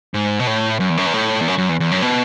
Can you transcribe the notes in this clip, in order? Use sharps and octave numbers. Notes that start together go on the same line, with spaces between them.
G#2
B2
A2
F#2
E2
F#2
E2
A2
E2
F#2
F#2
E2
E2
F#2
B2